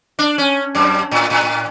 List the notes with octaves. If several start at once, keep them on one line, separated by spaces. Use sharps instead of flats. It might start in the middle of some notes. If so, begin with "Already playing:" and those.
D4
C#4
F#2
A2
A2
A2